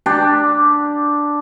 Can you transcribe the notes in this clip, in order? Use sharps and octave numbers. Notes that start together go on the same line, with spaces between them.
D4 G4 D5